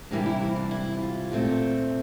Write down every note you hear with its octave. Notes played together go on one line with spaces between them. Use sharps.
C3 E3 G3 A#3 D4
E4
E4
D4
E4
F4
A#2 A3 C4